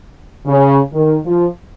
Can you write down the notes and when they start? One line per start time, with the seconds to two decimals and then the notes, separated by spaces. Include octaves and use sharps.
0.46 C#3
0.93 D#3
1.24 F3